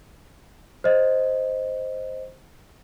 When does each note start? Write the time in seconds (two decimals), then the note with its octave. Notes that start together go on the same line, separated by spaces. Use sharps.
0.84 C5 D#5